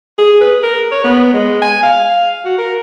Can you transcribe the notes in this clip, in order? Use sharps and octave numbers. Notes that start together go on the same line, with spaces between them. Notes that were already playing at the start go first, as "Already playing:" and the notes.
G#4
B4
A#4
C#5
B3
G#3
G#5
F5
F#4
A#4